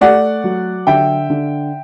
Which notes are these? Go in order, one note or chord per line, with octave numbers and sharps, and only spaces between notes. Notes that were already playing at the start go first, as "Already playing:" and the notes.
A3 D5 F#5
F#3
D3 E5 G5
D3